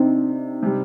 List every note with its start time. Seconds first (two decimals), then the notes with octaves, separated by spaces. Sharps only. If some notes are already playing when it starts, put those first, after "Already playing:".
Already playing: C3 C4 D4 D#4
0.63 C3 G3